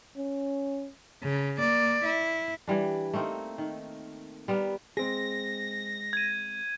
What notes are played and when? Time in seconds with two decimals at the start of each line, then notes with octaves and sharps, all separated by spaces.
0.17 C#4
1.23 C#3
1.59 A#3 D5
2.05 E4
2.67 E3 G3 D4
3.13 A3 A#3 C4 D#4
3.58 D#3
4.48 G3 B3 A#4
4.97 G#3 C4 G#4 A#6
6.13 G#6 D#7